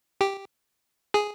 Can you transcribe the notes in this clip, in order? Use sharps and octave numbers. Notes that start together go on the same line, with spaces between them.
G4
G#4